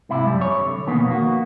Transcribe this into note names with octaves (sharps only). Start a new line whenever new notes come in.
G#2 C3 E4
F#2 G3
C#5
D3
F2 B2 D#3 A#3 B3
A#3 F#4